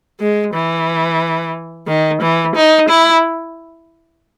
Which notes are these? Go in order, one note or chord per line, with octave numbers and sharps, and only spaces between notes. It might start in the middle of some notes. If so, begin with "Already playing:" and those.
G#3
E3
D#3
E3
D#4
E4